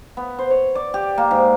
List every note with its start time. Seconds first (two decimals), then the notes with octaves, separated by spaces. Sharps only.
0.17 B3
0.39 C5
0.50 C#5
0.75 D5
0.94 G4
1.18 A#3
1.31 G#2